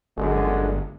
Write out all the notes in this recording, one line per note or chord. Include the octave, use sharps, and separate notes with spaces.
G1 F#2 D3 G#3